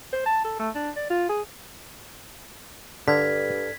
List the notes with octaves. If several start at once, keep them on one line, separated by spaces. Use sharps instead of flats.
C5
A5
A4
A3
D4
D5
F4
G#4
G2 D3 A4 D5 F6 G#6 B6